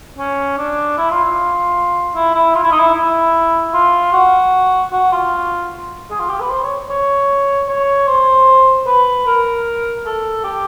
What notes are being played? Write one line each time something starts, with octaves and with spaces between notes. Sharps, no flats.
C#4
D4
E4
F4
F4
E4
E4
F4
E4
D#4
E4
E4
F4
F#4
F#4
F4
G#4
F4
G4
B4
C5
C#5
C#5
C#5
C5
B4
A#4
A4
G4